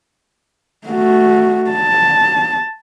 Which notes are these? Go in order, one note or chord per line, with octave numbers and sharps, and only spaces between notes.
A3 F#4
A5